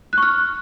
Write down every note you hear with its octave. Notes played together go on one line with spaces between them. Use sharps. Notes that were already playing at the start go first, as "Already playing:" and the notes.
C#6 F6 F#6